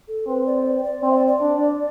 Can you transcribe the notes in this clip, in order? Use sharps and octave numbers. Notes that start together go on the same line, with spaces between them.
A4
C4 B4
D5
C5
D5
C5
D5
C4 C5
E5
D5
D5
D4